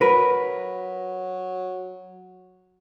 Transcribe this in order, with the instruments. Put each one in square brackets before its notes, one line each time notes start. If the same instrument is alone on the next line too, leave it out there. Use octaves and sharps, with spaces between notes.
[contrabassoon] F#3 [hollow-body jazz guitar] A#4 B4